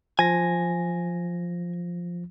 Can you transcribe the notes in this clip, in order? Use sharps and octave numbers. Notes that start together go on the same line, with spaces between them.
F3 G#5 A#6